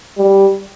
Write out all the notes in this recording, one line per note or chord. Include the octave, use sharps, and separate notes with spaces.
G3